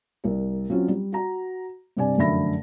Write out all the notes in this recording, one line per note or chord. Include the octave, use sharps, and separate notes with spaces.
C2 A#4
F#3 C4 C#4 F4
G3
F#4 A#5
G2 C3 D5 G#5
F1 F#2 D3 E5 B5 A#6